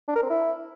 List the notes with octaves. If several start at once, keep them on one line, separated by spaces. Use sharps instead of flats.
D4
A#4
C4
E4